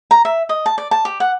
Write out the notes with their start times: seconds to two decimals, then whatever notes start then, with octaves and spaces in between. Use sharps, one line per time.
0.11 A#5
0.25 E5
0.49 D#5
0.66 A5
0.78 D5
0.91 A5
1.05 G4
1.20 F#5